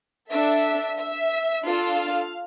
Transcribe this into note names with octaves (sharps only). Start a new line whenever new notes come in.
D4 A4 E5
E5
D4 F4 A4
F5